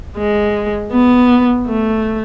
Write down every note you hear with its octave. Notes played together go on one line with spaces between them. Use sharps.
G#3
B3
A3